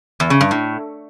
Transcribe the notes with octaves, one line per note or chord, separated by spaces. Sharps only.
E2
C#3
G2
A2